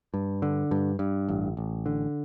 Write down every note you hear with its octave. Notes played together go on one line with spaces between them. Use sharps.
G2
D3
G2
G2
A1
A1
D3